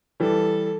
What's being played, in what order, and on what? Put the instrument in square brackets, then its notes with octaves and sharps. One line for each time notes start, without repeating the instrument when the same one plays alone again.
[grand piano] E3 G3 [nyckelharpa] A4